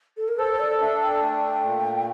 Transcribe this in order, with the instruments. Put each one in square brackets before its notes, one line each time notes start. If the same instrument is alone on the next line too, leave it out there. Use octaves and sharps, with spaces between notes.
[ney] A4
A#4
[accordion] A4 [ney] C5
[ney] C5
D5
[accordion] D4 [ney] E5
[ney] G5
[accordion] A3
A#2